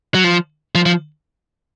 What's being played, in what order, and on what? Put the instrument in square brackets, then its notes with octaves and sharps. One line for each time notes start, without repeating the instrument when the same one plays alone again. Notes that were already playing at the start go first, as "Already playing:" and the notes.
[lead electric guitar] F#3
F3
F3
F3